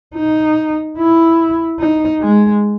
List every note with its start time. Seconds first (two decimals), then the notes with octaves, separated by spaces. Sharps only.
0.15 D#4
0.98 E4
1.80 D#4
2.21 G#3